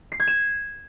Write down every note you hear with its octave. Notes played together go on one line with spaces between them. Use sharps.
C7
G#6
E7